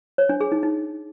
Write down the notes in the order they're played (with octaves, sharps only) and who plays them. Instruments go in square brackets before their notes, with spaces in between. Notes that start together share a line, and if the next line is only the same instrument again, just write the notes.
[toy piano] C#5
D4
G#4
D#4
D#4